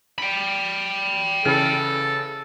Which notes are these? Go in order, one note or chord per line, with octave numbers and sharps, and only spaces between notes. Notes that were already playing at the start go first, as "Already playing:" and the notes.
G5 B5
C#3 E3 A4 F6